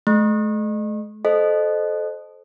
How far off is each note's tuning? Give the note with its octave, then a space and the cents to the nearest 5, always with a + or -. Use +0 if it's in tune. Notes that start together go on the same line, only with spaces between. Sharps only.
A3 -40 C#6 -40
A4 -20 C5 +0 D#5 -25